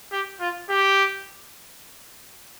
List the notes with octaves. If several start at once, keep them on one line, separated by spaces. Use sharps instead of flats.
G4
F4
G4